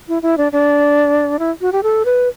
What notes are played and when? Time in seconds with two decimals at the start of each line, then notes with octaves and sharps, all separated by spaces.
0.08 E4
0.22 E4
0.38 D4
0.52 D4
1.39 E4
1.61 F#4
1.72 G4
1.83 A4
2.05 B4